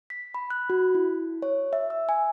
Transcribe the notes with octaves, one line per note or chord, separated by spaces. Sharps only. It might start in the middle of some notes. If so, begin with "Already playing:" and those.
B6
B5
F#6
F#4
E4
C#5
E5
E6
G#5